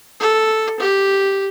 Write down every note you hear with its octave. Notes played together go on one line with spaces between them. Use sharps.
A4
G4